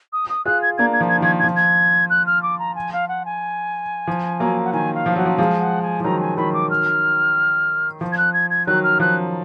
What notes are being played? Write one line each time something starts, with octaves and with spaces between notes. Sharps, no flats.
D#6
D#6
F4 G#4 F#6
G#6
A#3 D4 G#6
G#6
F3
G#6
D#3
F3 G#6
G#6
F3
G#6
F#6
F6
D6
A#5
G#5
F5
F#5
G#5
F3
F#3 A#3
F#5
D#3 G#5
F5
F3
F#3 F#5
F3
F3 G#3 F5
F#5
G#5
F3
D#3 F#3 A#5
G#5
D#3 F#3 B5
D6
F6
F3
G#6
F#6
G#6
G#6
D#3 F#3 F#6
F6
F3 F#6